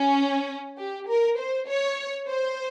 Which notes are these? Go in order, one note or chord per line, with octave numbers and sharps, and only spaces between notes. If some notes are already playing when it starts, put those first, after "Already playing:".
Already playing: C#4
G4
A#4
C5
C#5
C5